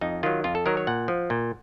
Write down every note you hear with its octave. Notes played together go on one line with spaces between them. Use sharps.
F2 D#4
D#3 F#3 F4
F2 F4
A4
D#3 F#3 A#4
C#5
A#2 F#5
F3
A#2